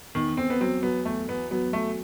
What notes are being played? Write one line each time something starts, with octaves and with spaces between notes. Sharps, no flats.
E2 D#3
E2 C4
B3
F#3 C4
F#3 B3
E2 A3
E2 B3
F#3 B3
F#3 A3